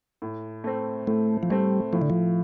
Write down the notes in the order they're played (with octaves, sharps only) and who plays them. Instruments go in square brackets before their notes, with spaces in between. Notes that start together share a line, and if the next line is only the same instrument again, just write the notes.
[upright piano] A2
A3 C4
[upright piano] A2 [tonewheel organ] A3
[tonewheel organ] F3
[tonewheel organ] G3 [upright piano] A3 C4
[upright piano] A2 [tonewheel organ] F3
[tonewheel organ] D3
F3